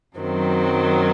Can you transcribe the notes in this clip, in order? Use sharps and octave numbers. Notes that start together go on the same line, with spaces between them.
F#2 D#3 F#3 C4